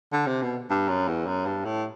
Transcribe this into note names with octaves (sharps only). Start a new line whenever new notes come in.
D3
C3
B2
G2
F#2
E2
F#2
G2
A2